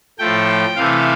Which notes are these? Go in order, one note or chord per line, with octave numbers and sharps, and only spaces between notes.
A2 F3 A3 G5
C3 E3 A3 F5